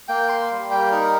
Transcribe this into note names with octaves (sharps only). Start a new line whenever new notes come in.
A#3 G5
C6
G3
G5
D#4 A#4